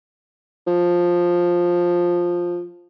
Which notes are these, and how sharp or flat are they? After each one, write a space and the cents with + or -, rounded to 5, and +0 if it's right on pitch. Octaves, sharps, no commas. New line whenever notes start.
F3 +5